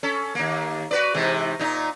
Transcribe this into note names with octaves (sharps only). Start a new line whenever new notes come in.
C#4 A4
D#2 A#3
F#4 B4 D5
G#2 C3 E3
A#2 D#4